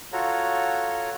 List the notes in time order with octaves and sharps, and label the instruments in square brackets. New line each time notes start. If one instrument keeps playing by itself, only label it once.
[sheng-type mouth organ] F4 F#4 A4 C#5 A#5